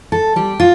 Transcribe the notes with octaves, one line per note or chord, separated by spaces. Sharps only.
A4
G3 G4
F4